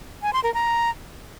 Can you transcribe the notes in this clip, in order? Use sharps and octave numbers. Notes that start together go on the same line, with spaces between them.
G#5
C6
A#4
A#5